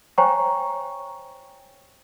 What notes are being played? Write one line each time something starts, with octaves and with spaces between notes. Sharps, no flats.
C5 C#5 G5 G#5 A#5 C#6